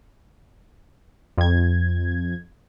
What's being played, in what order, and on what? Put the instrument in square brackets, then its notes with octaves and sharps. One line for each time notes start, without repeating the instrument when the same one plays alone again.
[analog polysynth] F2 G#6